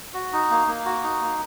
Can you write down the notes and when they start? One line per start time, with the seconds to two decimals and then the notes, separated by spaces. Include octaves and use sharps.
0.14 F#4
0.33 D#4
0.51 A#3
0.67 A#3
0.85 F#4
1.03 D#4
1.21 A#3